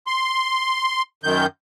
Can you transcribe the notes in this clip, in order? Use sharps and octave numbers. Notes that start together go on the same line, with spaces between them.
C6
F#2 D#3 G6